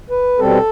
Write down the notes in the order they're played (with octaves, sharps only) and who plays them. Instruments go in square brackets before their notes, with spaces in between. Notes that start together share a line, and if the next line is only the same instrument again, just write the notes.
[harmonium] B4
B2 G3 C4 A4